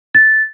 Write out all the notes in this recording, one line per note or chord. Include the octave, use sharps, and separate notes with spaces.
A6